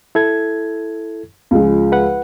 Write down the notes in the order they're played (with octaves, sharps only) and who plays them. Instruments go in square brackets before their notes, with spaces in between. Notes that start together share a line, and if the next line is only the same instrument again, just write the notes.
[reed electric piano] E4 A4 G#6
[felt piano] C#2 F3 G#3
[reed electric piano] B4 F#5